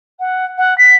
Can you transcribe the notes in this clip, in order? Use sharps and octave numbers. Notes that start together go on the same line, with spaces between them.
F#5
F#5
B6